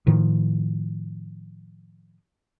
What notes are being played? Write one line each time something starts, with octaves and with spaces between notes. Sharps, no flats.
A2 D#3 F3